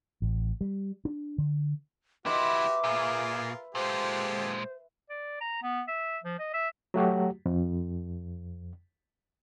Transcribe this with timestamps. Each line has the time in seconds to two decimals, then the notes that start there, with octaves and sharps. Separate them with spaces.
0.22 A1
0.61 G3
1.05 D4
1.38 D3
2.26 C#2 E4 F#4 G4 B4 E5 C6 D6
2.84 A#2 F4 G#4 A#4
3.75 A#2 G#3 F4 G4 A4 C5
5.10 D5
5.41 A#5
5.63 B3
5.88 E5
6.24 F3
6.39 D#5
6.54 E5
6.94 F#3 A3 F#4 G4
7.46 F2